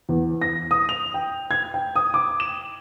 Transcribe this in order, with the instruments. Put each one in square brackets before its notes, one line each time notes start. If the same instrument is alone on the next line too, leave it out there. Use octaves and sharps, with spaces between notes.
[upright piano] E2
A#6
D#6
F7
G5
G#6
G5
D#6
D6
E7